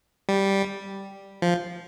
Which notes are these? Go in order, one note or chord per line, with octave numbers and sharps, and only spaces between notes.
G3
F3